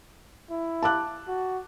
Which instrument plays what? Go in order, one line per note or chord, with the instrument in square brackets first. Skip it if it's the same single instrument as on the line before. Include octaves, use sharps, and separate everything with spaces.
[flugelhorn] E4
[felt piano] A5 D6 F#6
[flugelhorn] F#4